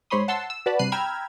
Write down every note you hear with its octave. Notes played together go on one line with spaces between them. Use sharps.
G#2 C5 C#5 B5 C6 D#6
F#5 A5 C6 E6
E6
F#4 B4 D5 A5 B5
G2 C3 F#6 C7 D#7
G5 A#5 B5 E6 F6 G#6